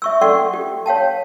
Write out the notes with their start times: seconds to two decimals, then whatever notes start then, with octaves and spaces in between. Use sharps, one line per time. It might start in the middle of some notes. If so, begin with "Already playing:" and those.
0.02 E5 C#6 E6
0.21 A4 D5 F#5 G5 C6 C#6
0.53 G4
0.86 C#5 F5 G5 A5